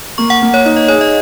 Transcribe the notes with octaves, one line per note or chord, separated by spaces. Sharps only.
A#3 C#6
F#5
A#3
C#5
D#4 C#5
D#5
G#4 C#5
D#5